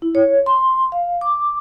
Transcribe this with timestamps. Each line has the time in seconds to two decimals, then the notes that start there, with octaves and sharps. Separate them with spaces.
0.02 E4
0.15 C#5
0.46 C6
0.92 F5
1.21 D6